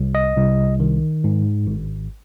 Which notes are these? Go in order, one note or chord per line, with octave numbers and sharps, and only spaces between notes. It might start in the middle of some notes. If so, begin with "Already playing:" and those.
Already playing: C2
D#5
C2
D#3
G#2
G#1